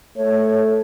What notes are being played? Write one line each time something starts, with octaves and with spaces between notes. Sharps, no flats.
A3 C#5